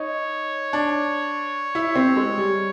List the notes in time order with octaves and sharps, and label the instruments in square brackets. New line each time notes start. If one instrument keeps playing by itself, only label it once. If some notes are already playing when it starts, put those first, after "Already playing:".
Already playing: [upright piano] D#4 [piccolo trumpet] C#5
[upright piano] D4
E4
C4
G#3
G3